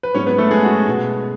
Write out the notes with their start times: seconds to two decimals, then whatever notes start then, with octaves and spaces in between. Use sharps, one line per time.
0.03 B4
0.15 G#2 F#3 B3 C#4 C#5
0.27 B3 B4
0.38 A3 A4
0.51 G#3 G#4
0.63 F#4
0.87 B2 G#3 B3